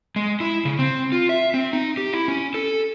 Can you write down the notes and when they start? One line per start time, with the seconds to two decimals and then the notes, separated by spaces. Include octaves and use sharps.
0.16 G#3
0.40 E4
0.65 C#3
0.79 C4
1.12 F4
1.29 E5
1.54 C4
1.73 D#4
1.97 G4
2.13 E4
2.28 C#4
2.54 A4